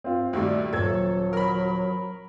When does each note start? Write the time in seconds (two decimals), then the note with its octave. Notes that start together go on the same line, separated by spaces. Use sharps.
0.04 C4 F4
0.33 D#2 A#2 G3 A3 F#4
0.73 D#1 F#3 A4 G#6
1.33 A#4 B5